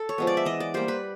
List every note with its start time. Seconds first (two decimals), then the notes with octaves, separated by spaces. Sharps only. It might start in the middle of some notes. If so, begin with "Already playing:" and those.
Already playing: A4
0.09 C#5
0.18 F3 G#3 B3
0.27 D5
0.37 E5
0.45 E3 D#5
0.60 D5
0.74 G3 A#3 C5
0.88 B4